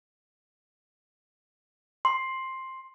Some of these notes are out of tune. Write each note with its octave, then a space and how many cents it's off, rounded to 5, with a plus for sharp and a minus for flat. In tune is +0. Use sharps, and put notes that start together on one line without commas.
C6 +10